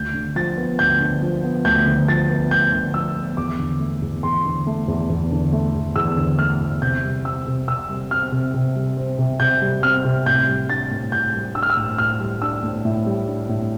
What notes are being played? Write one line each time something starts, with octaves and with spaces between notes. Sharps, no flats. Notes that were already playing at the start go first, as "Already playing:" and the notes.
Already playing: D2 G6
D3
F3 A6
B3
D2 G6
D3
F3
B3
D2 G6
D3
F3 A6
B3
D2 G6
D3
F3 E6
B3
E2 D6
D3
A3
E2
E2 C6
D3
A3
E2
E2
D3
A3
E2
E2 E6
D3
A3 F6
E2
C3 G6
G3
C4 E6
C3
C3 E6
G3
C4 F6
C3
C3
G3
C4
C3
C3 G6
G3
C4 F6
C3
A2 G6
G3
D4 A6
A2
A2 G6
G3
D4 E6
F6
E6
A2
A2 F6
G3
D4 E6
A2
A2
G3
D4
A2